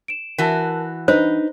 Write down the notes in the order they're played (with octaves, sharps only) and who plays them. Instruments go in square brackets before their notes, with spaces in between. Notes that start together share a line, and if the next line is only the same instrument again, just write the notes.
[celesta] D7 E7
[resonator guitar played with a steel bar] E3 F#4 [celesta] A#4 A5
[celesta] D4 [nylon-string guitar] D#4 B4 [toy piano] C5